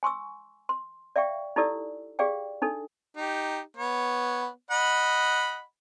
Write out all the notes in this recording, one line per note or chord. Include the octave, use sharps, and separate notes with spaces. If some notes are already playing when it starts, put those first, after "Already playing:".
G#5 C6 C#6 E6
C6
D5 E5 F5 G5 C#6
D#4 E4 G4 A4 D5 E6
G4 G#4 D5 F5 G5
D4 D#4 A4
D#4 G4
B3 C#5
D#5 F#5 B5